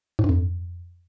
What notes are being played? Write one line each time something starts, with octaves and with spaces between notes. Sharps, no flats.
G#2
G2
F2